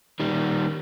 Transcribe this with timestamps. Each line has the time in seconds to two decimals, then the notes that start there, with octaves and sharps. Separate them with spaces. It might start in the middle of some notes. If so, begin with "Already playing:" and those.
0.20 D#3 G3